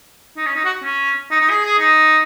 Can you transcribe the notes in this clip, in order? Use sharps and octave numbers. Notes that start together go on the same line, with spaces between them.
D#4
C#4
D#4
F#4
C#4
D#4
D#4
G#4
G#4
D#4